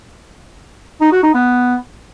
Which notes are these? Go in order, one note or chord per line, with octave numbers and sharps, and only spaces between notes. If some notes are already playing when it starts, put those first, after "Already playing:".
D#4
F#4
D#4
B3